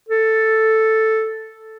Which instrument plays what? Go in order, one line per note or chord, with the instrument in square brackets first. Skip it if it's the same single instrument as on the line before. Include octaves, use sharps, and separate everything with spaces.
[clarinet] A4